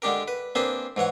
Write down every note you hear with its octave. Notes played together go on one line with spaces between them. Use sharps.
D3 G#3 D4 G4 A#4
B4
A#3 C4 D4 G#4 B4 C5
G#2 E3 C#5 F#5